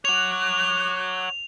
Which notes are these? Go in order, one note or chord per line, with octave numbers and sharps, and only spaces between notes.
C#5 F#5 D6 F#6 F7